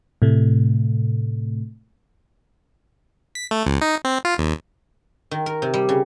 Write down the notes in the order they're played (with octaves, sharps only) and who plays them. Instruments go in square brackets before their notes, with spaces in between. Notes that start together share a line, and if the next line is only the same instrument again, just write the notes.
[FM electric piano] A2 C3 A3
[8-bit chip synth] B6
A3
C#2
D#4
C4
F4
D#2
[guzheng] D#3
A#4
C3
G3
C#3